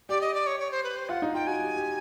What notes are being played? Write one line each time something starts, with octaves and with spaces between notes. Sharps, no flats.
G4 D5
D#5
D5
C#5
C#5
C5
B4
C5
F4 F#5
D#4
F4 G5
F#4 G#5
G4
G4